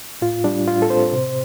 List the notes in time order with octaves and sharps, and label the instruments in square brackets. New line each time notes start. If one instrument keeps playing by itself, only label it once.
[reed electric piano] A2 F4
G3 D4
A2 F4
A4
C4 C5
C3